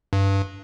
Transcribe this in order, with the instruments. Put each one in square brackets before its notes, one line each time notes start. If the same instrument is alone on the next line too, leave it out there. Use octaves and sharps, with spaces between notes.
[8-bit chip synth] G2